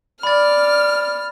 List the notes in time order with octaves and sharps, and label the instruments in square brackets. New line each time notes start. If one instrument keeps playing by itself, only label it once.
[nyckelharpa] D5 [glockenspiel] B5 A6 [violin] F6